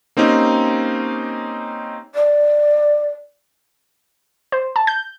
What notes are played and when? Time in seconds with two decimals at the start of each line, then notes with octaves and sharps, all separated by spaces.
0.17 A#3 C4 C#4 D#4 G4
2.15 D5
4.52 C5
4.76 A5
4.87 G6